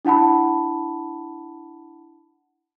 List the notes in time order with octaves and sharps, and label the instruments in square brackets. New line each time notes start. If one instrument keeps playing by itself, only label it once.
[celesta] D4 E4 F#5 A5 B5